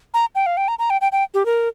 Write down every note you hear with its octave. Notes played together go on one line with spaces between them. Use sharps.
A#5
G5
F5
G5
A#5
A#5
G5
G5
G5
G4
A#4